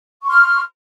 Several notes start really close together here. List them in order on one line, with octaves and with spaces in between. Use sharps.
C#6 C6 F6